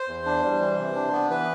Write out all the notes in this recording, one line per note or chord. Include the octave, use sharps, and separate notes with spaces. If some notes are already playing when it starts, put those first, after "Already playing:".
Already playing: C5
E2
D4
G3
E3
C3
D4
B3
E3 B4